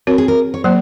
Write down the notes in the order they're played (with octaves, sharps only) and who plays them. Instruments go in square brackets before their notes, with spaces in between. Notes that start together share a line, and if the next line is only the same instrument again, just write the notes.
[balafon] C4 F#4 C#5 [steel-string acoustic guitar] A#4
[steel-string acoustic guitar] G#4
A#4
C#5
[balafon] F#3 A#3 [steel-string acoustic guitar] C5